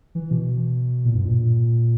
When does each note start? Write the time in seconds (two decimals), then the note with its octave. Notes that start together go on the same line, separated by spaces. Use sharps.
0.15 E3
0.31 B2
1.05 A#2
1.14 G2
1.24 A#2